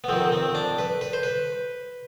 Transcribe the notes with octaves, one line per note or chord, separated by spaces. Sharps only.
B3
F2 D#3 C4
C4
D4
B4
B4
C5
B4